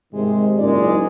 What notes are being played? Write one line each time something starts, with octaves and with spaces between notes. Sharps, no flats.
G#2 C3 D#3 G#3
F#1 F#2 A#2 G#3 D#4 D5